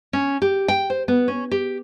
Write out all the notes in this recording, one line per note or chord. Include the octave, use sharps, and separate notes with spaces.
C#4
G4
G5
C5
B3
C#4
G4